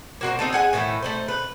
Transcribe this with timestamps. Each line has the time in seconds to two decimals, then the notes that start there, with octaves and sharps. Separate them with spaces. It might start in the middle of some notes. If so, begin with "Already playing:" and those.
0.21 A#3 F#4 C5
0.39 C4 D#4 A4
0.53 G#4 F#5 G#5
0.73 A2 D#3 E3 A3
1.02 A3 D#4 C5
1.28 B4